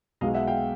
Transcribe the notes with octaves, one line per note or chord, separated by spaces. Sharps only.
B1 B2 G#3 D#5 F5
E5 F#5
F5 G5